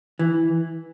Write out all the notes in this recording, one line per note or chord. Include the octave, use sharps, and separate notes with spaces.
E3